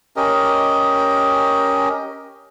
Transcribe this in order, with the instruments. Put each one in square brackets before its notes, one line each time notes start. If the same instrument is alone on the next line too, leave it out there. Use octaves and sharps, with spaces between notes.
[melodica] C#4 G4 A#4 D#5